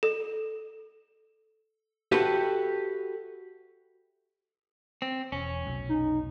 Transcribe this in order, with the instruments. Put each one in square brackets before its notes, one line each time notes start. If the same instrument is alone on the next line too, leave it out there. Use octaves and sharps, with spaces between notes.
[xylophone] A4
[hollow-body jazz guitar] F#4 G4 A4 B4 C5 E5
[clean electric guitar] C4
[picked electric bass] E1 [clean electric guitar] C#4
[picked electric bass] F1 B1
[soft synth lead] D#4